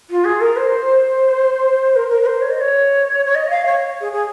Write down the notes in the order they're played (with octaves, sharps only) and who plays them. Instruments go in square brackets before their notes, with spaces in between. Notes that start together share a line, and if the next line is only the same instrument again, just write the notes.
[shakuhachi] F4
G#4
A#4
C5
A#4
A#4
A#4
C5
C#5
D#5
C#5
C#5
D#5
F5
C#5
G#4
G#4